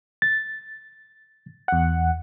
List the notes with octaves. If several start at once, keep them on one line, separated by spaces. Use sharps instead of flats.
A6
E2 F#5